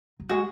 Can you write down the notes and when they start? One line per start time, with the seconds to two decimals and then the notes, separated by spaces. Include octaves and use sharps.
0.20 F#3
0.29 G#3 F#4